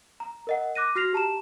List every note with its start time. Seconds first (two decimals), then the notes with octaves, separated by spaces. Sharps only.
0.20 A#5
0.47 A#4 D#5 F#5
0.75 D6 F#6 A#6 D#7
0.96 F#4 F6 A#6 C7 F7
1.13 G4 A5 A#5 E7